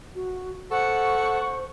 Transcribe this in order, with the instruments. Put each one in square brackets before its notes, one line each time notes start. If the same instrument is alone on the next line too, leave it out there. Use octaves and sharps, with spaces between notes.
[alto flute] F#4
[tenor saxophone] A4 [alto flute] C5 [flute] F#5 [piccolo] C#6